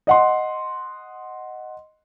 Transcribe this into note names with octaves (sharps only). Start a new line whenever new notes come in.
D#5 F#5 C6